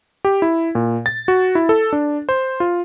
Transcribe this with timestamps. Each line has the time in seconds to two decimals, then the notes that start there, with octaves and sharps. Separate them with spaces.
0.25 G4
0.42 E4
0.75 A#2
1.06 A6
1.28 F#4
1.55 E4
1.69 A4
1.93 D4
2.29 C5
2.60 F4